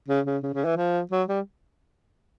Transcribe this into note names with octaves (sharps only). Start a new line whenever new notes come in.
C#3
C#3
C#3
C#3
E3
F3
F#3
G3